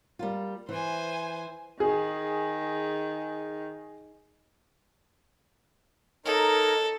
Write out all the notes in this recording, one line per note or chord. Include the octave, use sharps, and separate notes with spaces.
G3 A#3 F4
E3 C5 G#5
D#3 G#4
D#4 A4 A#4 C#5